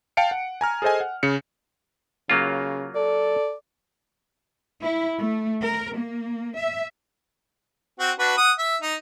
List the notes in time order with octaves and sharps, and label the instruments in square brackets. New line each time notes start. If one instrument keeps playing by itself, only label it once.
[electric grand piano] F5 G5 A5 C#7 D7
F#5
G#5 A#5 F6
G#4 A4 C5 D#5 G#5
F#5
C#3 C#7
[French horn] C#3 [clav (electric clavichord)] F#3 A#3 F4
[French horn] A4 [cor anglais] D5
[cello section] E4
A3
A#4
A#3
E5
[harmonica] C4 F#4
D4 F#4 B4
F#5 D#6
E5
D#4